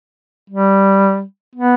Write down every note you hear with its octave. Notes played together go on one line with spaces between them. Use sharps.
G3
B3